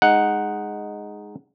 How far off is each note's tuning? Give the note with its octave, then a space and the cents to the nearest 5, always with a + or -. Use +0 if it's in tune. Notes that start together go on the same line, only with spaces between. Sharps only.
G#3 +0 D#4 +0 F#5 +0